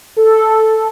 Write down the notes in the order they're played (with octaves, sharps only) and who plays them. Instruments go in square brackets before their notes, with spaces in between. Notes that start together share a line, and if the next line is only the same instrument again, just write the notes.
[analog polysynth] A4